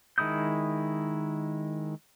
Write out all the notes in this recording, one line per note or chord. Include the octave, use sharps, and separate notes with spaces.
D#3 G#3 E4 D#6 G6